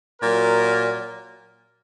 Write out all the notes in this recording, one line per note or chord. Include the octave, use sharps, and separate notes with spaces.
A#2 F#3 A#4